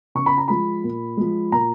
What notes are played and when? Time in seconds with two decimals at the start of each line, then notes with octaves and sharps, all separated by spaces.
0.15 C#3 C#6
0.26 B5
0.38 A#5
0.48 F3 G#3 B5
0.84 A#2
1.17 F3 G#3
1.52 A#2 A#5